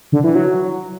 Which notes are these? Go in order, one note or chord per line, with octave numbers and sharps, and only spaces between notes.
D3
E3
F#3